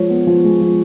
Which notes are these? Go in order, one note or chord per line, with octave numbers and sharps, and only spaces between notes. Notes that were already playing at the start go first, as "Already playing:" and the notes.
Already playing: F3 G#3 C#5
B3
F3
G#3
F3